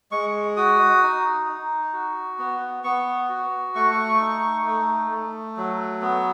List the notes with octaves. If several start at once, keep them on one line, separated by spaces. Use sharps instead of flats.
G#3 C#6
F#4 D#6
D#4
D#4
F#4
B3
B3 C#6
F#4
A3 C#6
D#4
A3
A3
F#3
B3